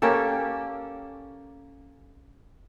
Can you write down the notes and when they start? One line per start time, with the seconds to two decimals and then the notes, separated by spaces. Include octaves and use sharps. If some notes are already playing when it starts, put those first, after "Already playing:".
0.02 A#3 C#4 G4 A4